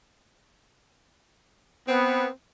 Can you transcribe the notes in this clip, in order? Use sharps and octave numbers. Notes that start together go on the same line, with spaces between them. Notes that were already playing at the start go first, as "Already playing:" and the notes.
B3 C4